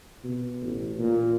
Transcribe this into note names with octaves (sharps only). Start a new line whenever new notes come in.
B2
A1
A#2